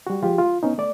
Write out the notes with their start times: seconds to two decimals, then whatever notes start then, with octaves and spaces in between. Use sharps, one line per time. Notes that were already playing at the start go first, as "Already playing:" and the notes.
0.07 G3 F#4
0.23 F3 G#3 F4 G4
0.39 F4
0.63 B3 C#4 D#4
0.78 A3 D5